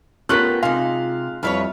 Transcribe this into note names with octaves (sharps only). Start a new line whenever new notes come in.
A3 B3 C#4 F4 G4 A#4 F#6 B6
C3 G#3 D#4 F4 F5
F2 G3 E4 F4 B4 C#5 E5